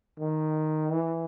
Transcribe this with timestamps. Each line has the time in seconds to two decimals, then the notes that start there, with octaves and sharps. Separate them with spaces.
0.19 D#3
0.90 E3